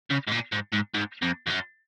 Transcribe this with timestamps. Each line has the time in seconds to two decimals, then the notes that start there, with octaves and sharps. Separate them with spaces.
0.10 C#3
0.27 G#2
0.31 A#2
0.52 G#2
0.73 G#2
0.95 G#2
1.22 F2
1.47 F2
1.50 F#2